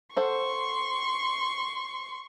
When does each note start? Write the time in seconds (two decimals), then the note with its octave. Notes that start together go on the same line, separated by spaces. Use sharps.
0.17 A4 C5 F#5 C6 C#6